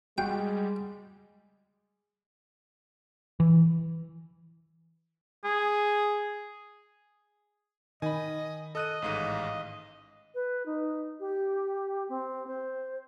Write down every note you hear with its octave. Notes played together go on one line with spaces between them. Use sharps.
G3 G#3 F#4 F5 G5
E3
G#4
D#3 D#5 G#5 B5
A4 D#5 F#6 D#7
A1 G#2 F5 D#7
B4
D#4
G4
C4
C5